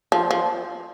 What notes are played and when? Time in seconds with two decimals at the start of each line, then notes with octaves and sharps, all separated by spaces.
0.12 F3
0.31 F3